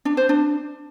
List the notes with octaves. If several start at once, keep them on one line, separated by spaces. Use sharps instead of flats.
D4
C5
D4